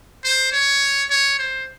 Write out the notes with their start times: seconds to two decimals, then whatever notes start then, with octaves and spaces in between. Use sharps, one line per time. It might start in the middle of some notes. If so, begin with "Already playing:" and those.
0.24 C5
0.52 C#5
1.10 C#5
1.39 C5